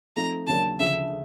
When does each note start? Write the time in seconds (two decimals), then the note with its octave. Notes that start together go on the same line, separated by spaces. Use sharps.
0.16 F3 A3 C4 D#4 A#5
0.47 D#2 C#3 F#3 A#3 D4 A5
0.79 D2 C#3 F3 E5